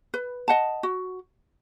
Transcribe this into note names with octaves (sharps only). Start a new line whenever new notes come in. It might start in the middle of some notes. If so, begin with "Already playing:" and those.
B4
D#5 F#5 A5
F#4